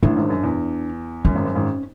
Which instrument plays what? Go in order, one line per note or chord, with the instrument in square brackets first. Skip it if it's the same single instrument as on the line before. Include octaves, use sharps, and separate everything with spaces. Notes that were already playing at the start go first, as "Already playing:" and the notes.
[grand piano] A1 A2 [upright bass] D4
[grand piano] G#1 G#2
F#2
E2
[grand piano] F#2 [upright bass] C#4
[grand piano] G#1 G#2
F#2
G#1 G#2